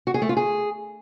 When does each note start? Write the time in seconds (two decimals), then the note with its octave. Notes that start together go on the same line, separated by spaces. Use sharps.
0.07 F#4
0.14 G#4
0.22 A3
0.29 F4
0.37 G#4